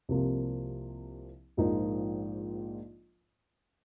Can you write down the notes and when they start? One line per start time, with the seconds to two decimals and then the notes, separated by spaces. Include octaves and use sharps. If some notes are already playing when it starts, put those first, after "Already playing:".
0.09 C2 C3 F3 A#3
1.57 A#1 G#2 F3 A#3 D#4